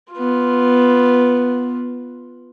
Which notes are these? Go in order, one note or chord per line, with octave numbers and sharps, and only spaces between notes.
B3 F4